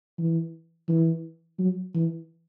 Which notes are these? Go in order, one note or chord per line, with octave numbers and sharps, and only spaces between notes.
E3
E3
F#3
E3